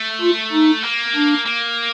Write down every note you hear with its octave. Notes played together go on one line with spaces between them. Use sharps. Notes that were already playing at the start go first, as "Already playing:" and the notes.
Already playing: A3
F4
D#4
A#3
D4
A#3